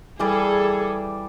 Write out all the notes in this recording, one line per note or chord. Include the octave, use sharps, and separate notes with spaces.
E3 G3 G#4 A4 D5